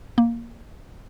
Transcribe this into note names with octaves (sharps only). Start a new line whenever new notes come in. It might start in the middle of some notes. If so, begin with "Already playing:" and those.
A#3